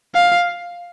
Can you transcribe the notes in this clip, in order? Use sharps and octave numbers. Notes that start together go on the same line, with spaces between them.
F5